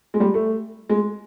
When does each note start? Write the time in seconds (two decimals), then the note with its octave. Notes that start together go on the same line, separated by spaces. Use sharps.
0.14 G#3
0.20 G3
0.34 A3
0.90 G#3